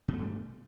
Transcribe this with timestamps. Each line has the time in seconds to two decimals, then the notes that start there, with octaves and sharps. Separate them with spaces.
0.08 B2
0.13 A3
0.18 G2
0.23 G3